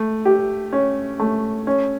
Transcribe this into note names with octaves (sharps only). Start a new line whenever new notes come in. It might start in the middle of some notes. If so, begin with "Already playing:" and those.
Already playing: A3
G4
C#4
A3
C#4